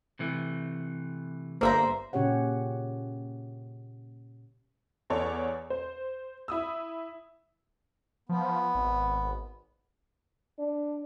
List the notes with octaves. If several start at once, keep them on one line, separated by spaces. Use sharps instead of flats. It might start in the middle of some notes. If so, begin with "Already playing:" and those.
C3 E3 A3
G1 A#3 C5 D5 E5 A#5
A#2 C#3 C#4 G4 C#5 F#5
E2 A4 C#5 D5
C5
E4 D#6 E6
F3 B3
G#1
D4